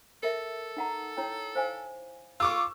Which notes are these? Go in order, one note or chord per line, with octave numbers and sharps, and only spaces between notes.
A4 A#4 E5
D#4 F#5 A#5
E4 C#5 G5
C5 F5 G#5
F4 C#6 D6 E6